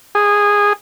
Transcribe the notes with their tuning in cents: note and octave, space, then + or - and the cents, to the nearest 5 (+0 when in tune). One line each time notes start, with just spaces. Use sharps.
G#4 -15